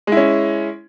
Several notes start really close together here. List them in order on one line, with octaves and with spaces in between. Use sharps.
G#3 E4 C#4